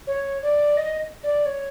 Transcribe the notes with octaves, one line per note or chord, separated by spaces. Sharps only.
C#5
D5
D#5
D5
C#5